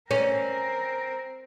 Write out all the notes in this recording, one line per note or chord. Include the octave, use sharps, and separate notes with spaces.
C4 C#4 A#4